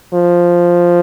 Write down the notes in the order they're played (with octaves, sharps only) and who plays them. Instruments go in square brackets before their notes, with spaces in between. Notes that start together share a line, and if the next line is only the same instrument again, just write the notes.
[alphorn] F3